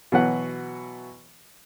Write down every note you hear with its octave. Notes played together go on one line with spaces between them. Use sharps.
B2 E3 F#3 B4 F#5